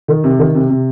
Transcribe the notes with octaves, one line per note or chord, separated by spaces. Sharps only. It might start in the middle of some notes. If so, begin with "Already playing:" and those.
D#3
C3
D#3
C3
C3